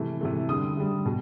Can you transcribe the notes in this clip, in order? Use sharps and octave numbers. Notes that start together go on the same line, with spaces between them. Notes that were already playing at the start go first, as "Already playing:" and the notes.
Already playing: C3 E3 A3
C3 E3 A3
D3 G3 D#6
D3 G3
B2